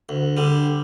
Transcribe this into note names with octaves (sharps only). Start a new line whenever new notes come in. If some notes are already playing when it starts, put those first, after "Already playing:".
D2
D3 G3